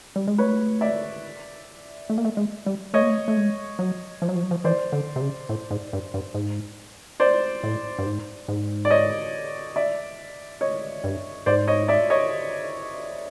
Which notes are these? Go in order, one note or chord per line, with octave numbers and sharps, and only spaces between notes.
G3
G#3
A3 B4 C#5
D5 E5
A3
A#3
A3
G#3
G3
A3 C#5 D#5
A#3
A3
A3
G#3
F#3
F3
F#3
F3
F#3
F3
E3 C5 D5
D3
C3
C#3
A2
G#2
G2
G2
G#2
C5 D5
A2
G2
G#2
G#2
D5
C#5 D#5
D5 E5
C#5 D#5
G2
G#2 C5 D5
C#5 D#5
D5 E5
C#5 D#5